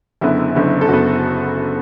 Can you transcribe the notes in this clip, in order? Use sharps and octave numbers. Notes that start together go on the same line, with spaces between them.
F#1 F#2 D3 B3 E4
F#1 F#2 D3 B3
A4
F#1 F#2 D3 B3 F#4